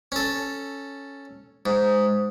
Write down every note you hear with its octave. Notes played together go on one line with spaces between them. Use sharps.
C#4 A4
G#2